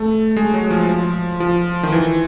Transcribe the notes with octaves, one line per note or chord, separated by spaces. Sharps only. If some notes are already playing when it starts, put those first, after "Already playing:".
Already playing: A3
G#3
F#3
F3
F3
F3
D#3
E3